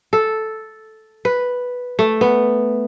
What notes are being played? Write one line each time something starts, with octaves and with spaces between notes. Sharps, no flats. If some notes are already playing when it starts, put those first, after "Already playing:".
A4
B4
A3
B3